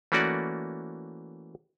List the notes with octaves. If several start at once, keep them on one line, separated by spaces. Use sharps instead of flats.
E3 A3 A#3 C#4 F#4 D5